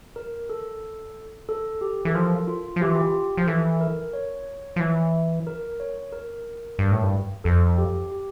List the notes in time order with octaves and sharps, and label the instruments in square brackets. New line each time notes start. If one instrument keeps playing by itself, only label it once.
[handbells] A#4
A4
A4
G4
[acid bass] E3 [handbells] A4
[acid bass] F3 [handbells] A#4
[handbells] F4
[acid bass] F3
[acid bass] E3 [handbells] G4
[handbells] F4
G4
[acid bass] F3
[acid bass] E3 [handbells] A4
[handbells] A#4
C#5
[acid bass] F3
E3
[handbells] A#4
C#5
A#4
[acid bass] G2
A2
G2
[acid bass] F2 [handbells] A4
[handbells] G4
G4